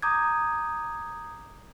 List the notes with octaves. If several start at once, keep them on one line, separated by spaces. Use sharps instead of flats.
A#5 D6 D#6 G6 G#6